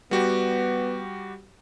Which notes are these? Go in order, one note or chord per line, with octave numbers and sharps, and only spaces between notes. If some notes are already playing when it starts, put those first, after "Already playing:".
G3 B3 F#4 G4